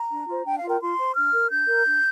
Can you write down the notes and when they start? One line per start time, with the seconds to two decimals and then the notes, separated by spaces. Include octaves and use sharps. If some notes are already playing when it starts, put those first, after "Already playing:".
Already playing: A#5
0.11 D4
0.28 F4 C5
0.45 D4 G5
0.57 F5
0.63 F4 A#4 G5
0.80 F4 C6
0.98 C5
1.15 D4 F6
1.33 A#4
1.50 D4 G6
1.68 A#4
1.86 D4